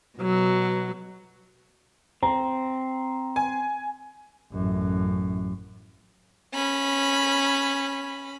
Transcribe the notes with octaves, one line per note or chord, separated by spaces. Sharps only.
B2 F#3
C4 A#5
G#5
A1 F#2
C#4 B5